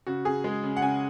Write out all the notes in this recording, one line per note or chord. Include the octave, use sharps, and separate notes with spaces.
C#3 F#4
C#3 G#4
G#3
C#3
F#5
C#3 G#5